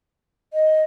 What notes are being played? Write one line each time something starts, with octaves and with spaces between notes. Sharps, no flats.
D#5